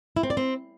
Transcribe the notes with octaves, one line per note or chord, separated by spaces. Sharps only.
E4
C4
D5
C4